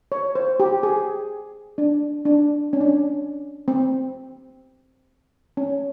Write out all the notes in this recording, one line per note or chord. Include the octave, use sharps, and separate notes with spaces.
C#5
C5
G4
G#4
D4
D4
C#4
D4
C#4
C4
C#4